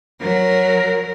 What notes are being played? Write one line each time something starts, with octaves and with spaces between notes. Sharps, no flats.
F#3 A#4